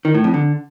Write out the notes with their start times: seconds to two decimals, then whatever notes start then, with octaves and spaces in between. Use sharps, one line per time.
0.05 D#3
0.14 A2
0.24 F2
0.34 D3